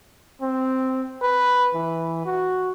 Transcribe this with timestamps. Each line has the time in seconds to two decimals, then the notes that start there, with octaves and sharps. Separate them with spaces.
0.42 C4
1.22 B4
1.74 E3
2.26 F#4